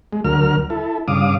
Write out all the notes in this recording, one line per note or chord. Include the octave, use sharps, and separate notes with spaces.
G#3
D2 F#3 A#4 F6
E4 A4
G2 C#3 F5 D6 D#6